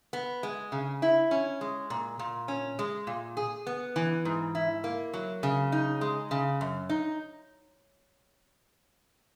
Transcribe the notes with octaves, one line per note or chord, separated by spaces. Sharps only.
B3
G#3
C#3
E4
C#4
G#3
A#2
A#2
C#4
G#3
A#2
G#4
B3
E3
G#2
E4
A#3
F#3
C#3
D#4
G#3
C#3
F#2
D#4